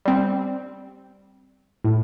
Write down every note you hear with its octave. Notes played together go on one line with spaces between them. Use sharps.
G3 C4
A2